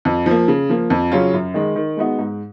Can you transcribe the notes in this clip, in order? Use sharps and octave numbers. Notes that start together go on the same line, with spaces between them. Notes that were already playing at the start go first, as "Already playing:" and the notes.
F2
F3 A#3
C#3
F3 A#3
F2
C#3 F#3 C#4 F4
F#2
D#3 G#3
D#3
G#3 B3 D#4 F#4
G#2